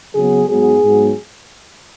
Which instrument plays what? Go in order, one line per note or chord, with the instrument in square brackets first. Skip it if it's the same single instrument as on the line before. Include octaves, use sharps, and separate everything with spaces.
[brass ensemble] C#3 F#3 B3 G#4
G#2 F#3 B3 G#4
G#2 F#3 B3